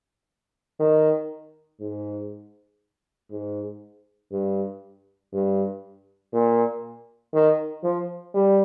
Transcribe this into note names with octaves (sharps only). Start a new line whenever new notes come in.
D#3
G#2
G#2
G2
G2
A#2
D#3
F3
G3